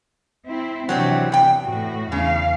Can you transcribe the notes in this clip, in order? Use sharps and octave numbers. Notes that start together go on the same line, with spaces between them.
C4 E4
C3 E3 F#3 C4 D4
E2 G5
A2 F#4
E2 C#3 F5